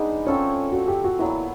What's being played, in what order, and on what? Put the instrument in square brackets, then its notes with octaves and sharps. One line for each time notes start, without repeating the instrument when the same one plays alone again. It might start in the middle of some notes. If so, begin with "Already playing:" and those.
Already playing: [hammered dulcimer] G#3 B3 D4 [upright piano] D#4
[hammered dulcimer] C4 F4 A4 C#5 [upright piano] C#4
[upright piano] F#4
G4
F#4
[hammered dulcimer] A#2 F#3 B3 [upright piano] E4